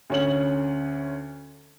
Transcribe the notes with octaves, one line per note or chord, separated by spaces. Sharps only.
D2 C#4 F#7